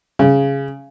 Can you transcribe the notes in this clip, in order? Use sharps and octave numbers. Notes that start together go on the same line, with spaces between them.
C#3